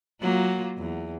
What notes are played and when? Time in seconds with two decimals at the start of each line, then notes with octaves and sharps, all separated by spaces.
0.21 F#3 A#3 F4
0.78 E2